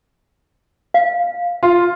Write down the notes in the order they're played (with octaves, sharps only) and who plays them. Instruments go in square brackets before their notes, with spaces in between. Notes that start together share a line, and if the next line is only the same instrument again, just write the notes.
[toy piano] F5
[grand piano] F4